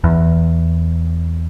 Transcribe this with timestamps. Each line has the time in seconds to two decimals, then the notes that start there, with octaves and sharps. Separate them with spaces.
0.04 E2